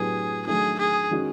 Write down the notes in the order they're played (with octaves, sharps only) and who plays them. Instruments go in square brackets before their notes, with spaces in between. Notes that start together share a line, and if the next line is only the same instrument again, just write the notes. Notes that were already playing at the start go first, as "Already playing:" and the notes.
Already playing: [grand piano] A2 F#3 B3 D4 G4 [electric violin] G#4
[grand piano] D#3 F#3 A3 D4 [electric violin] G#4
[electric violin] G#4
[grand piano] D#3 G#3 C#4 F#4